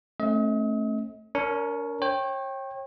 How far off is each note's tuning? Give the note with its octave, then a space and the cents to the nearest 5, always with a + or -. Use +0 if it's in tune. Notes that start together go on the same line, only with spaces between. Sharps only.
A3 +0 C#4 -35 D#5 +40
D4 -45 A#4 +0 C#5 +0
C#5 -35 G5 +0